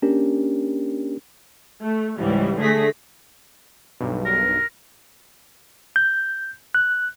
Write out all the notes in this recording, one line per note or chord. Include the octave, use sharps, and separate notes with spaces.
A#3 C#4 D4 G4 A#4
A3
C#2 G#2 E3 G3
D3 A3 G#4 A#6 B6
B1 G2
A#4
G6
F#6